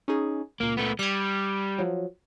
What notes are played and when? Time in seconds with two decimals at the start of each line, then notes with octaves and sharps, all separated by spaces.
0.08 C#4 D#4 G#4
0.60 C#2 A#2 A#3
0.77 A3 B3
0.99 G3 F#6 G#6
1.78 F3 F#3